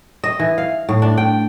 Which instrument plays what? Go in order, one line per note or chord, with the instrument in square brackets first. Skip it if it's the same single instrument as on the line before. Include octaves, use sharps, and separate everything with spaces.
[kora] D#5
E3
F5
A2
D4
G5